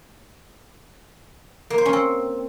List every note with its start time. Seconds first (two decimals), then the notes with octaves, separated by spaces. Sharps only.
1.70 A#3
1.78 C5
1.85 C#4
1.93 C4